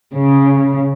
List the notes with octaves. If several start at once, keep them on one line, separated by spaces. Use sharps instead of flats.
C#3